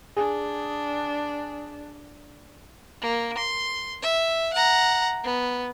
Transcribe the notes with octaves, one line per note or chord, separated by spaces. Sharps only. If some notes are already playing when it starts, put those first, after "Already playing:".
D4 G#4
A#3
C6
E5
F#5 A#5
B3